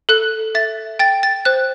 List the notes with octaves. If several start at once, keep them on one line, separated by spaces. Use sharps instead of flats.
A4 F#6
E5 A6
G5 A6
A6
C5 F#6